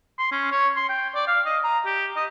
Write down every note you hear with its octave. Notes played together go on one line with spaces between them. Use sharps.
C6
C#4
C#5
C6
G5
D5
F5
D#5
A#5
G4
D#5